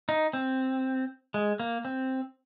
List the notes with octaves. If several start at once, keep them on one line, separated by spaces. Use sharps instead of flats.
D#4
C4
G#3
A#3
C4